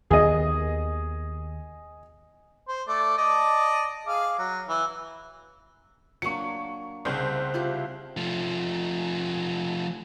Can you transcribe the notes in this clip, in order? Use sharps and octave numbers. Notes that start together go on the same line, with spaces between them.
D#2 D#3 B3 G#4 D#5
C5
A3 D5
D5 D#5 A5
G#4 F5 D6
F#3
E3
F#3 A#3 D4 C#6 C#7
C2 C#3 C4 C5
E4 F4 G4
F3 A3